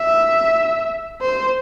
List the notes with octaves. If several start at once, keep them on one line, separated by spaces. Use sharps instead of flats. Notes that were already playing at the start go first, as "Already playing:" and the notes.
Already playing: E5
C5